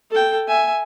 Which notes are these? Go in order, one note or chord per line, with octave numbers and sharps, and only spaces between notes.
A4 G5
E5 G#5